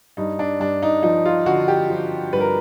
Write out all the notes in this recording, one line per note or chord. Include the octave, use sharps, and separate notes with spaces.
G2 D#4
D4
G2 D4
D#4
F3 D#4
F4
D3 F#4
G4
F3
G2 B4
A#4